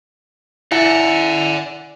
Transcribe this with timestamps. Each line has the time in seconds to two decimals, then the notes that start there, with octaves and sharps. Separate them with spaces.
0.72 E4 D5 E5 F#5 G#5